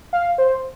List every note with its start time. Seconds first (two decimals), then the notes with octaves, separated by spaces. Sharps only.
0.13 F5
0.38 C5